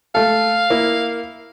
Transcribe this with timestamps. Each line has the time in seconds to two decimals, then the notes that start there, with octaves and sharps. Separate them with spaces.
0.15 A3 A4 F5
0.70 A#3 E4